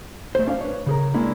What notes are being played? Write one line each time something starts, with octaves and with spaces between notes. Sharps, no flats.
A3 C5
C#4 D4 F5
B4 C#5
C#3 G#4 A#4
G#3 A#3 C#4 D4 E4